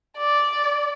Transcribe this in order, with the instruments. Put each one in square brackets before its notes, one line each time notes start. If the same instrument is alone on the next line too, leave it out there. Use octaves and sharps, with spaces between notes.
[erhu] D5